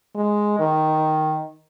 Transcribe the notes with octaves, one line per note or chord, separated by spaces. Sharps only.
G#3
D#3